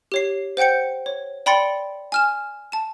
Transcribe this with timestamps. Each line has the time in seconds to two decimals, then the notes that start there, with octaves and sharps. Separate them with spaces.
0.12 G4 C#5 C7
0.57 C5 F#5 G5 G6 C#7
1.06 C#5
1.46 D5 G5 B5 C6 A6 C#7
2.12 G#5 F6 E7
2.72 A5 E7